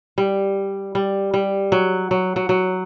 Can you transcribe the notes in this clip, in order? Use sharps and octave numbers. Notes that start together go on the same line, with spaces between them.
G3
G3
G3
F#3
F#3
F#3
F#3